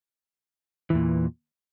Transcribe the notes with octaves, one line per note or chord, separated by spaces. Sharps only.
E2 A#2 E3